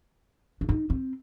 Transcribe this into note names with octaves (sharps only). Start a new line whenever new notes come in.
D4
D#4
C4